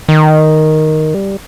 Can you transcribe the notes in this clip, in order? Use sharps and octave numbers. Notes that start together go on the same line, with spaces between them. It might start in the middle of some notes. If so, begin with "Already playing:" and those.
D#3
G3